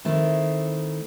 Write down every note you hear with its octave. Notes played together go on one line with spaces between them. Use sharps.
D#3 A3 C4 E4